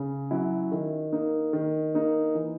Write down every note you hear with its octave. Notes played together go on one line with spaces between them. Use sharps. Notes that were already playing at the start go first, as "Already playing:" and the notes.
Already playing: C#3
F#3 C#4 E4
D#3
A#3 D#4
D#3
A#3 D#4
E3